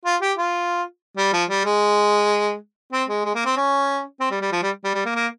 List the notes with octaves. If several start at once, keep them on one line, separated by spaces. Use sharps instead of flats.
F4
G4
F4
G3
F3
G3
G#3
C4
G#3
G#3
A#3
C4
C#4
C4
G3
G3
F3
G3
G3
G3
A#3
A#3